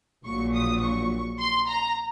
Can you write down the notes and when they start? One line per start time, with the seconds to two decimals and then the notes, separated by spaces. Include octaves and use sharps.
0.25 A#1 A#2 F#3 C#6
0.54 D#6
0.81 C#6
1.39 C6
1.68 A#5